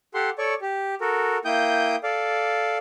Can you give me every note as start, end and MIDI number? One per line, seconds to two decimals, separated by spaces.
0.14 0.30 67
0.14 0.30 69
0.14 0.30 78
0.14 0.30 84
0.38 0.54 69
0.38 0.54 73
0.38 0.54 74
0.38 0.54 85
0.62 0.95 67
1.01 1.38 66
1.01 1.38 69
1.01 1.38 70
1.45 1.96 58
1.45 1.96 64
1.45 1.96 79
1.45 1.96 87
1.45 1.96 91
2.03 2.78 69
2.03 2.78 74
2.03 2.78 77